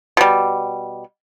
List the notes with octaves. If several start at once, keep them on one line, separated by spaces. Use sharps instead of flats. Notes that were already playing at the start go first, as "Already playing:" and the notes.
B2 G3